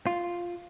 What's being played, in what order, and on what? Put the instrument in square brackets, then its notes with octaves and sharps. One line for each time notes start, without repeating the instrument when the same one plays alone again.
[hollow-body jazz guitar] F4